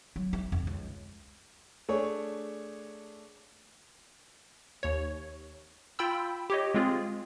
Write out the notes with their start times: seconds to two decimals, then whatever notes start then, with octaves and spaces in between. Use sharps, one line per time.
0.16 F#3
0.33 E4
0.52 F2
0.67 C#2
1.89 A3 D4 G#4 C#5
4.83 D#2 C#5
5.99 F4 G5 B5 E6
6.50 G4 C#5 D#5
6.74 G#3 C4 F4 G#4